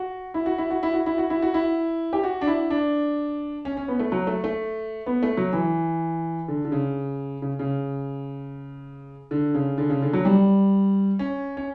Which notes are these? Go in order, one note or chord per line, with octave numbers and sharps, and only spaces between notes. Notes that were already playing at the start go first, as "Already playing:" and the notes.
Already playing: F#4
E4
F#4
E4
F#4
E4
F#4
E4
F#4
E4
F#4
E4
G4
F#4
D4
E4
D4
C#4
C#4
B3
A3
F#3
A3
A3
B3
A3
F#3
E3
D3
D3
C#3
C#3
C#3
D3
C#3
D3
C#3
D3
F#3
G3
C#4
C#4